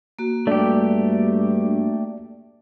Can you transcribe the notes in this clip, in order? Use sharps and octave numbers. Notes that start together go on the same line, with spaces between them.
A#3 F#4
G2 A3 G4 D5